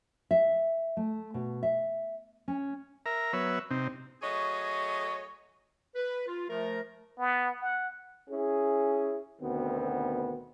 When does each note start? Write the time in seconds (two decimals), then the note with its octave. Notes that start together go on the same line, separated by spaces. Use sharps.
0.31 E5
0.97 A3
1.34 B2
1.63 E5
2.48 C#4
3.06 A#4 E5 A#5
3.33 F#3 B3 B4 C#5 E5 E6
3.71 C3 C4 D#4
4.22 F#3 A3 G#4 C#5 D#5
5.96 B4
6.28 F4
6.50 F3 A3 A#4
7.19 B3
7.61 F#5
8.30 C#4 E4 G#4
9.42 D2 B2 D#3 B3 C4